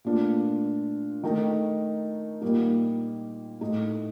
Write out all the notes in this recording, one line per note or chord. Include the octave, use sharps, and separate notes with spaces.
A#2 A3 D4 F4
D#3 A3 D#4
A#2 G3 A#3 D#4
A2 A3 D#4